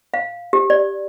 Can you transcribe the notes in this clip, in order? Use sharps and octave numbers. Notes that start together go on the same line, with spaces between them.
F5
G4
D5